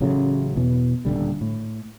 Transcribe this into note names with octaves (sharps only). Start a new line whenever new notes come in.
A1 C#3 F#3 A3
E2 B2 E3
D#1 B1 D3 G3
A2